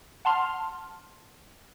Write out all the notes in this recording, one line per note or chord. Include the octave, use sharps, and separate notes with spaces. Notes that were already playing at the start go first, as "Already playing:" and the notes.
F#5 A5 C6 F6